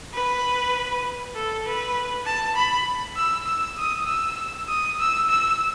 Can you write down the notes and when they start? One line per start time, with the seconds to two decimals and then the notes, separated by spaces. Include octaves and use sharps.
0.14 B4
1.35 A4
1.65 B4
2.26 A5
2.56 B5
3.17 E6
3.47 E6
3.78 D#6
4.07 E6
4.68 D#6
4.99 E6
5.30 E6